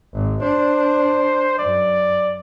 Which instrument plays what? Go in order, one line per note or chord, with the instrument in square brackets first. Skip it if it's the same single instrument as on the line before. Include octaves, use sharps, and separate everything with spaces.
[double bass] G#1
[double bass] D4 [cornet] C5
[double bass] F#2 [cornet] D5